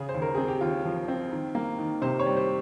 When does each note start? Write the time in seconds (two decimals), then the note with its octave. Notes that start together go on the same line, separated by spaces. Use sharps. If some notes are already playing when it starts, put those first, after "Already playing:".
Already playing: C#3 G#4
0.09 C5
0.14 D#2
0.22 A#4
0.35 C4 G#4
0.48 G4
0.61 D#2 F4
0.85 F3
1.08 C4
1.31 D#3
1.55 A#3
1.79 D#3
2.02 C3 C5
2.20 C#5
2.26 G3
2.37 C5